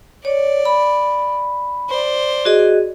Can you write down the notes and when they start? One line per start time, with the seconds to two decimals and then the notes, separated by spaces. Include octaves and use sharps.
0.25 C#5 D5
0.65 B5
1.89 C5 D5
2.45 F#4 G#4 D#5